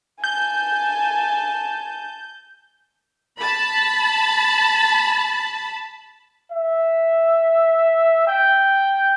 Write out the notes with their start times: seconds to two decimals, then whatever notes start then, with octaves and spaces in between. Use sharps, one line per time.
0.24 G#5 A5 G6
3.38 A5 B5
6.52 E5
8.28 G5